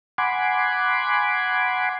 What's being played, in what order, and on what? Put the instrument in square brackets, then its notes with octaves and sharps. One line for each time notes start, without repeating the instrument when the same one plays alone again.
[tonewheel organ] F#5 G#5 B5 C6 D6